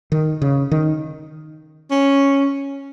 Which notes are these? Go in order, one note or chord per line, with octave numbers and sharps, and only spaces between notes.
D#3
C#3
D#3
C#4